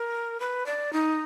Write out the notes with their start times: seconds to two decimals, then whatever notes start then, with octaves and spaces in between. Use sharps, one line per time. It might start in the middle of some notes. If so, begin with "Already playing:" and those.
Already playing: A#4
0.40 B4
0.66 D5
0.93 D#4